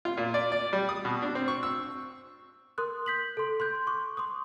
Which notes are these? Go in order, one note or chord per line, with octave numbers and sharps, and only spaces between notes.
F4
A#2
D5
D5
G3
D#6
B2
D4
C4
C#6
E6
A#4 C6 D#6 F#6
G6 B6 F#7
A4 C6
C6 F#6 G6
C#6 D6
C6 D6 D#6